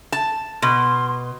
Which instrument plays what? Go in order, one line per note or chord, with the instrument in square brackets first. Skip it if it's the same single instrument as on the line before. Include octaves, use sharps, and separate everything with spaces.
[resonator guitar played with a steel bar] A5
[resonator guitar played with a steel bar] B2 [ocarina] C6